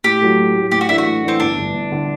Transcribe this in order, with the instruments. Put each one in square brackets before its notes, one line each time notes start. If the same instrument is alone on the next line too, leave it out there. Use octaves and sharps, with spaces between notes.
[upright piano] A2 [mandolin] G4
[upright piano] F#3 A3
A2
F#3 A3
[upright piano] A2 [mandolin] G4
[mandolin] F#4
[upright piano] E3 A3 D4 [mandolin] E4
[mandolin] F#4
[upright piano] A2
[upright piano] E3 A3 D4 [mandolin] C4
[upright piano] G1 [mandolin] D4
[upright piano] G2 D3
G1
D3